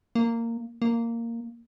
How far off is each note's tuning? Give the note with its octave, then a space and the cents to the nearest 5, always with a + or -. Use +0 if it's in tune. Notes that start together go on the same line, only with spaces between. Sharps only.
A#3 -15
A#3 -10